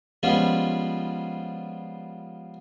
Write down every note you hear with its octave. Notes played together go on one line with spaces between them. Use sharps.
F3 G3 G#3 B3 C#4 F4